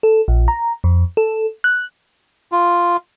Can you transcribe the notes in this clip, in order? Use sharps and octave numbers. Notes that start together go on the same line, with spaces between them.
A4
A#1
A#5
F2
A4
F#6
F4